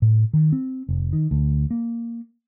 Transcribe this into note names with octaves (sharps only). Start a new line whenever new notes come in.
A2
D#3
C4
F1
D#3
D2
A#3